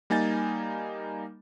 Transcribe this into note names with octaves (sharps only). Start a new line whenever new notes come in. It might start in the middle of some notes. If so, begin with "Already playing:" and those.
G3 A#3 D#4 G#5 A6